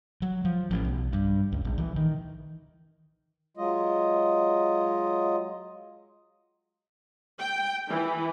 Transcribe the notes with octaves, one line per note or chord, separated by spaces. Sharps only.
F#3
F3
A1
B1
G2
C#2
A#1
E3
D#3
F#3 G#3 F4 D#5
G5
E3